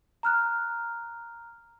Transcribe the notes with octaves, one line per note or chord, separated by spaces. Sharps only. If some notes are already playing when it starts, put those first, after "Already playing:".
A#5 F6 F#6